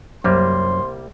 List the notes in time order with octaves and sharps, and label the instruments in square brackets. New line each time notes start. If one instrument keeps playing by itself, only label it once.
[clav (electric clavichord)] C2 G3 A#3 [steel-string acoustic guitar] F#2 [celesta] C5 [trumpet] C6